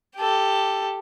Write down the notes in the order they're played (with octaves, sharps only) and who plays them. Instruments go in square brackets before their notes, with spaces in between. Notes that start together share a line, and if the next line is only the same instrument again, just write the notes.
[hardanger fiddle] G4 A4